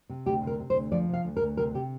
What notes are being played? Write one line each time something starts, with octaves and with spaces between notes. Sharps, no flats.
C3
D2 G4
C3
A#4
C3
C5
D2
F3 D5
C3 F5
D2
A#4
D2
C3 A#4
C3 G4